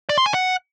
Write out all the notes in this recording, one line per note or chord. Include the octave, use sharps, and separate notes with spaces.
D5
C6
G#5
F#5